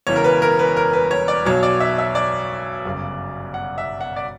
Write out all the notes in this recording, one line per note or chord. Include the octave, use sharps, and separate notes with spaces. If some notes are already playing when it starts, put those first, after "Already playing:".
E1 E2 C#3 E3 C#5
A#4
B4
A#4
B4
A#4
B4
C#5
D5
B1 B2 F#3 C#5
D5
E5
E5
D5
G1 F#2 C#3
F#5
E5
F#5
D5